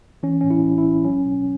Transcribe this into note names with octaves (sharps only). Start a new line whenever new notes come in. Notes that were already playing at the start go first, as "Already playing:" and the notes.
E3 C#4
A2 C#4
E4
B1
E4
B1
F#3 C#4
B2